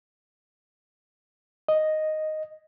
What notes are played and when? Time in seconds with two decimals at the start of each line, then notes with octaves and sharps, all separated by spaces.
1.68 D#5